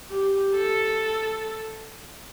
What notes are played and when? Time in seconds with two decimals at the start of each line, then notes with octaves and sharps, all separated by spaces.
0.11 G4
0.55 A4